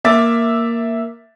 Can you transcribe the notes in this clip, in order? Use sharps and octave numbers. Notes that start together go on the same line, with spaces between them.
A#3 E5 D6 A6